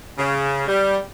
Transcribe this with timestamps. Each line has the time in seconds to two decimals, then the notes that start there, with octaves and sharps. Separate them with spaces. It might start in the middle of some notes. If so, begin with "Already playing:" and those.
0.18 C#3
0.68 G3